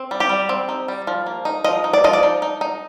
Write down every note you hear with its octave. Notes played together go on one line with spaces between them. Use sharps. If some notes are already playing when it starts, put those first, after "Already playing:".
Already playing: C4
G3
G4
G3
C4
D#4
G3
F3
A#3
D#4
F3 D#5
D#4
D5
F3 D#5
D5
D#4
D#4
D#4